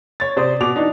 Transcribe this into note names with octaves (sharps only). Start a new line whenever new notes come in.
C#5 A6
C3 C5 D5 D#6
B2 D6 F7
E3 D4 D#4